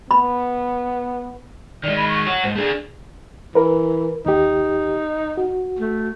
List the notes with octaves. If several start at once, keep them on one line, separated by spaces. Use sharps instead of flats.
B3 B5
D#3 G#3 D5
B5
C#6
F#4 C#5
G#2 C5
A3 D4 G#4
E3 A#4 B4
D#2 D#4 G4
F#4
A3